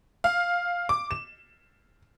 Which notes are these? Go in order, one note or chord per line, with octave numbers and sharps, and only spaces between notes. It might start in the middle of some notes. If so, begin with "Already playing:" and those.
F5
D6
E7